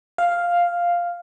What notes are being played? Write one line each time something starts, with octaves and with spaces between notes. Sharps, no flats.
F5